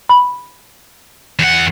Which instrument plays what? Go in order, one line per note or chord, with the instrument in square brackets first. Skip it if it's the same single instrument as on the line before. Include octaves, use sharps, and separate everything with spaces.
[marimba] B5
[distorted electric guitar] E2 F#5